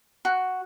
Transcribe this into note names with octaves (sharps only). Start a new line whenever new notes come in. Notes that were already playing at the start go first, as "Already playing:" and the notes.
F#4